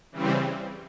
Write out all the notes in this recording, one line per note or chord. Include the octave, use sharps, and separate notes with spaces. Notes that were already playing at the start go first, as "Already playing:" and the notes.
C#3 E3 G3 C4